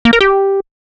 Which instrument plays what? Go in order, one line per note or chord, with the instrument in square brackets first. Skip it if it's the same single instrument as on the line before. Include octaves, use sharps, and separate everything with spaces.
[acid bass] A#3
A#4
G4